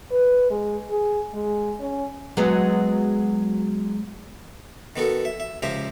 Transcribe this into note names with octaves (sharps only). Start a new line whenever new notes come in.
B4
G#3
G#4
G#3
C#4
F#3 G#3 B3
D#3 B3 F#4 A4
E5
E5
C#2 F3 G4 E5 A#5